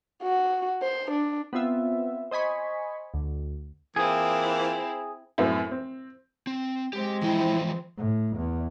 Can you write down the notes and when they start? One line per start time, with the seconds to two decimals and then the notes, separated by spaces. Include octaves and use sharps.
0.23 F#4
0.82 C5
1.11 D4
1.53 B3 C4 F4 E5
2.31 C5 D#5 G#5 B5 C#6
3.14 D2
3.96 E3 A#3 C4 E4 F4 G#4
5.38 F#2 A2 B3 C4 E4
5.71 C4
6.47 C4
6.93 G#3 C4 G4
7.23 E3 F3 E4 G5
7.98 A2
8.37 E2